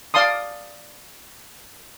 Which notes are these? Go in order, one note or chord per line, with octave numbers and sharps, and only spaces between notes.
D5 F5 A5 C6 D#6